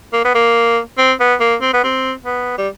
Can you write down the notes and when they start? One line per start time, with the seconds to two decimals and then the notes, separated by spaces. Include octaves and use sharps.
0.13 A#3
0.25 B3
0.35 A#3
0.98 C4
1.20 B3
1.40 A#3
1.61 C4
1.73 B3
1.84 C4
2.25 B3
2.58 G3